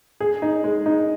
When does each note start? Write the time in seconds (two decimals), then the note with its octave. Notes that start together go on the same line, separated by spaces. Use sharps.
0.20 G#4
0.42 D#4
0.64 G#3
0.86 D#4